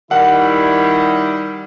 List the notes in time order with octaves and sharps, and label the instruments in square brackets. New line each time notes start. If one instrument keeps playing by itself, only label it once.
[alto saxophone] D#3 [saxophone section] G3 [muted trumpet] E4 [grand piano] F#5